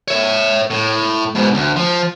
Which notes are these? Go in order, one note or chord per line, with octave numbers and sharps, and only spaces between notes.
C#5 E5
A2
G#2 B2
D2
F3